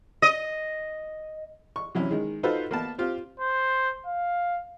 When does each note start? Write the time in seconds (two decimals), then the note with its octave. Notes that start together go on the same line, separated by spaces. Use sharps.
0.22 D#5
1.76 C#6
1.95 C3 E3 F#3 C#4 E4
2.11 D#3 G#3
2.43 D#4 F4 F#4 A4 B4 C5
2.71 A#3 B3 A5
2.98 C4 F4 G4
3.40 C5
4.06 F5